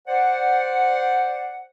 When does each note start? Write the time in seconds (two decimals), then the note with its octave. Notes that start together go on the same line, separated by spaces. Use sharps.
0.08 C5 D5 F#5